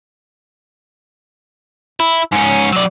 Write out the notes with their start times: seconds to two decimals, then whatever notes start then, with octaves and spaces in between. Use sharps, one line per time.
2.00 E4
2.32 G#2 C#4
2.72 F#3 D5